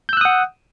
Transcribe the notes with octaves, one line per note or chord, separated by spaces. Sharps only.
F#5 D#6 E6 F#6 G6